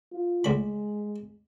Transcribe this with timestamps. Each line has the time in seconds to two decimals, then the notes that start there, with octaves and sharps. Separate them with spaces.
0.12 F4
0.44 C#2 G#3 B5